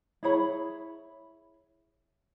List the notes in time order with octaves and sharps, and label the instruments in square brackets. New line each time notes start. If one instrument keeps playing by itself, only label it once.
[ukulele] E4 G#4 C#5 B5